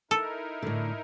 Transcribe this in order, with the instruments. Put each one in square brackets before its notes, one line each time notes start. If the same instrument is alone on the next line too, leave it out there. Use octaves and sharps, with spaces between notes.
[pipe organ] D#4 E4 A#4 [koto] A4
[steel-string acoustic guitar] A2 D3